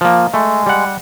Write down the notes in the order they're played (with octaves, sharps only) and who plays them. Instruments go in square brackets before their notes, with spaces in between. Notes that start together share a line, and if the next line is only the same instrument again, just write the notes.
[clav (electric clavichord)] F3 A#3
[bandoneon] G#3 [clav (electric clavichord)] A3
[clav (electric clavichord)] G3 F#5